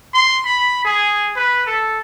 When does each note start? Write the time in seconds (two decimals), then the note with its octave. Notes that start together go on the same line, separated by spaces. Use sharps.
0.14 C6
0.45 B5
0.85 G#4
1.36 B4
1.66 A4